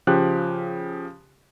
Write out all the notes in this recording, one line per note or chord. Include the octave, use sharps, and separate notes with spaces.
C#3 F3 G4 F#6